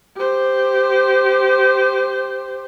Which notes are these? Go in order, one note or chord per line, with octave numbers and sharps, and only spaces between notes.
G4 C5